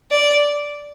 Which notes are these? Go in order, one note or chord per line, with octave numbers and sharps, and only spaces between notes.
D5